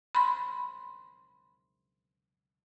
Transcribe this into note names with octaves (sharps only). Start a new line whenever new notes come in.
B5 C6